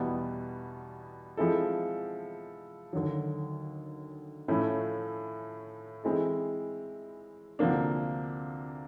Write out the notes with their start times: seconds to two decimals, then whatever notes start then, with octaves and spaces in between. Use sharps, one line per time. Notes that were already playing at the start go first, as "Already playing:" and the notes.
Already playing: E2 B2 G3 B3 E4
1.37 F3 G#3 C4 E4 A4
2.93 D#2 D3 F#3
4.48 A2 F3 A3 C#4 E4
6.04 E3 G#3 C4 E4 A4
7.59 D2 C3 F3 A#3 D4